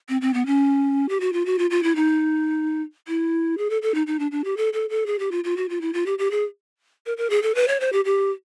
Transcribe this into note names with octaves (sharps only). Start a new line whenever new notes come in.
C4
C4
B3
C#4
G4
F#4
F4
F#4
F4
F4
E4
D#4
E4
G#4
A4
A4
D#4
D#4
D4
D4
G4
A4
A4
A4
G#4
G4
F4
F4
F#4
F4
E4
F4
G4
G4
G#4
A#4
A#4
G#4
A4
B4
C#5
C5
G4
G4